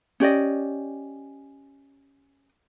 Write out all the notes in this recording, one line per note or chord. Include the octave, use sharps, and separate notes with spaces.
C#4 G4 D5 D#5